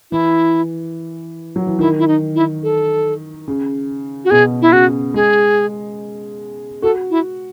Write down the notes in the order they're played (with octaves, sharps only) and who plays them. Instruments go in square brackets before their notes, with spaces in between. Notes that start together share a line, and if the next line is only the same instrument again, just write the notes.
[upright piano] E3 [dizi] E4
[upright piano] F#3
E3
[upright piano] D#3 [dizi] E4
[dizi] E4
D#4
E4
A4
[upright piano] C#3
[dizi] F#4
[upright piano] B2 [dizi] G#4
[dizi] E4
[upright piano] C#3 [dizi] F#4
[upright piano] G#3 [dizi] G#4
[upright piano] F#4 [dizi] A4
[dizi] E4